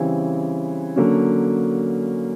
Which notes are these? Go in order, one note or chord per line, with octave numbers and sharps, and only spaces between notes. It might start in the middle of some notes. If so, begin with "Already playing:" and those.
Already playing: C#3 E3 G3 C4 E4
D3 F#3 A#3 C#4